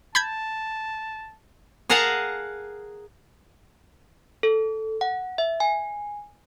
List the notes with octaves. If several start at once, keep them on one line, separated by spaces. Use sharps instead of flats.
A5 B5 G6 G#6
G#4 A#4 F5 F#5 A5 A#5
A4
F#5
E5
G#5